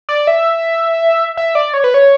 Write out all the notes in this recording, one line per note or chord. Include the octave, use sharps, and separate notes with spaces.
D5
E5
E5
D5
C#5
B4
C#5